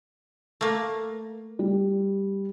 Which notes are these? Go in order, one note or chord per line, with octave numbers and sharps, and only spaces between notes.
A3 A#3
G3